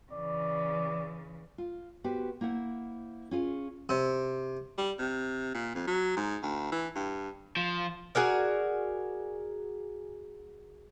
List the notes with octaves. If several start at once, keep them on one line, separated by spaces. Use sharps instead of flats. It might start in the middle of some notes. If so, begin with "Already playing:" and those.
C#3 E3 D5
F4
B3 F#4 G4 B4 C5
A#3 E4 C5 F#5
C#4 F4 G#4
C3
G3
C3
A#2
F2
F#3
G#2
D2
E3
G2
F3
F#4 G#4 A#4 D5